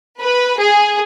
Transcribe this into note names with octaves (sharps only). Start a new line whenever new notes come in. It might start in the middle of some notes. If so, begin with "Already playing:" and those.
B4
G#4